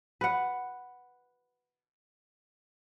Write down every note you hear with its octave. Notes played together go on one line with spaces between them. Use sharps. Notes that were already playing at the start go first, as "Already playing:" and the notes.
B4 F#5